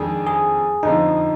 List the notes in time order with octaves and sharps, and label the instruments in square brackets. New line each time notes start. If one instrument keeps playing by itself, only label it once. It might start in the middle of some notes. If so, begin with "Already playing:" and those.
Already playing: [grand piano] F2 D#3 G#3 D4 [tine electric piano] G#4
[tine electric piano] G#4
[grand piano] F2 D3 F3 [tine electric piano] D#4